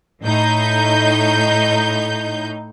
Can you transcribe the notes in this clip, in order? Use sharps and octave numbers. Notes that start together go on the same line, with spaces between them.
A2 D#4 G6